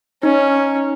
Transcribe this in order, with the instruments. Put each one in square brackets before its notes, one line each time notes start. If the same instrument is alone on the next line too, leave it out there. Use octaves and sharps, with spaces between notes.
[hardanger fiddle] C#4 [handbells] D#4